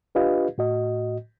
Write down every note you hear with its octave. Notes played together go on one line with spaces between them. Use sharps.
D4 F4 G4 B4 D#5 F5
A2 F#4 D#5